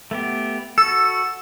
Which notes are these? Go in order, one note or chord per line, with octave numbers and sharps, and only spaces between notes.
A3 B3 G4
F#4 A4 E6